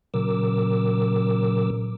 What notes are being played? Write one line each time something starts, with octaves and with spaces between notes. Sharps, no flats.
A#2 C#3 F#3 A#4 D6 E6